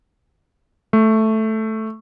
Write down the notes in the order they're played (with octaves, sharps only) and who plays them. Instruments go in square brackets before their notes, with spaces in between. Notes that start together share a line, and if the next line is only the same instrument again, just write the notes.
[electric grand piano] A3